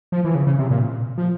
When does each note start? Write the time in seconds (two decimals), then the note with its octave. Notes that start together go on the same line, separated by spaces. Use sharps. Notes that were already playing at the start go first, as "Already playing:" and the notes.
0.12 F3
0.25 E3
0.35 C#3
0.47 C#3
0.59 C3
0.70 A#2
1.18 F3